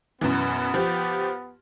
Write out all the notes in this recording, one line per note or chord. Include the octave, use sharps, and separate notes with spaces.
F#2 B2 E3 B3
F3 G4